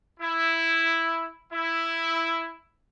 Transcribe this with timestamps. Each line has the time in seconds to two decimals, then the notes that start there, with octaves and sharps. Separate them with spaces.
0.20 E4
1.52 E4